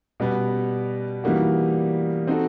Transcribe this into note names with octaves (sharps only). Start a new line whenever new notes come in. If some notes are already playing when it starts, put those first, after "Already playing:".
B2 G3 B3
E3 G3 A#3 D#4 F#4
C4 D#4 F#4 A4